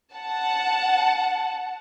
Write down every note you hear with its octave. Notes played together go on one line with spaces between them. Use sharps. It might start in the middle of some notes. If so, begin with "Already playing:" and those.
F#5 A5